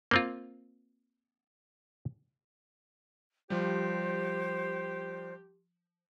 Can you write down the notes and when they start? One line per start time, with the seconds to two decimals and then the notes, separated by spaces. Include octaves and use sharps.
0.11 A#3 C4 F4
3.50 F3 G3 G4 C5